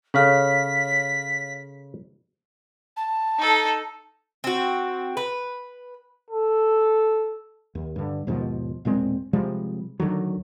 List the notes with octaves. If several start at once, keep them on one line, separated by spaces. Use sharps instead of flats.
C#3 A4 C#5 F5 F6 B6
A5
D#4 A4
C4 F#4
B4
A4
D#2
G2 D3
D#2 G#2 B2 F3
E1 A#2 G#3 C4
C3 F3 G3 G#3
D2 D3 D#3 F#3